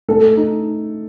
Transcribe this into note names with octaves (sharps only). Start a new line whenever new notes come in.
A3 A4
D#4